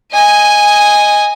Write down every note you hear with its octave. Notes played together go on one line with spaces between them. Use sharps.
D#5 G#5